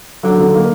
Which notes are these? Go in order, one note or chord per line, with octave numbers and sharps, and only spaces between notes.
D3 F#3
D3
D#3 A#3